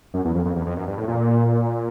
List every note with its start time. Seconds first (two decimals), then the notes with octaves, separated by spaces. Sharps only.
0.14 F#2
0.25 E2
0.35 F2
0.45 F2
0.56 E2
0.66 F2
0.77 F#2
0.87 G2
0.97 A2
1.08 A#2